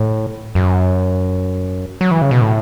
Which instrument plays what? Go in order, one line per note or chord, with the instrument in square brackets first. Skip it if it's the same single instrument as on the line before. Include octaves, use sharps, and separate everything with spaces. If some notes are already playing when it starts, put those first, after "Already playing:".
Already playing: [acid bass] A2
F#2
F#3
E3
C#3
B2
A2